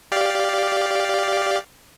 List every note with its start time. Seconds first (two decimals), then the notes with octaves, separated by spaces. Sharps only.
0.12 G4 D5 F5